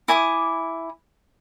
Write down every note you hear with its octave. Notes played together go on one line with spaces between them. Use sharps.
E4 G#5 D6 D#6